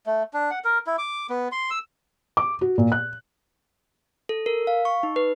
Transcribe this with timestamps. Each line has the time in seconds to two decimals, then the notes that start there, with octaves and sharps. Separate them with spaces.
0.06 A3
0.34 D4
0.51 F#5
0.64 A#4
0.87 E4
0.98 D6
1.30 B3
1.52 C6
1.71 E6
2.37 D6
2.61 F#4
2.78 A#2
2.92 F#6
4.29 A4
4.46 A#4
4.67 F5
4.85 C#6
5.03 D#4
5.16 B4